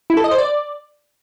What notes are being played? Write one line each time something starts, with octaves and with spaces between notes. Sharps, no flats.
E4
A4
D#5
C5
D5